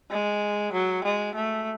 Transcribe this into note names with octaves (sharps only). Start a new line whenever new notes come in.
G#3
F#3
G#3
A3